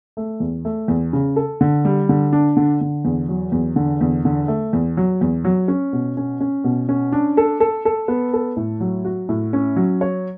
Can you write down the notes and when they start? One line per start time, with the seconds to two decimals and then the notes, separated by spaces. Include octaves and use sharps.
0.17 A3
0.40 E2
0.65 A3
0.88 E2
1.13 C#3
1.36 A4
1.61 D3
1.85 G3
2.09 D3
2.33 D4
2.57 D3
2.81 D3
3.05 E2
3.29 F#3
3.52 E2
3.76 D3
4.01 E2
4.25 D3
4.48 A3
4.73 E2
4.97 F#3
5.21 E2
5.44 F#3
5.68 C#4
5.93 B2
6.17 C#4
6.40 C#4
6.64 B2
6.89 C#4
7.12 D4
7.37 A4
7.60 A4
7.85 A4
8.08 B3
8.33 A4
8.57 A2
8.80 F#3
9.05 F#4
9.29 A2
9.53 C#4
9.76 F#3
10.01 C#5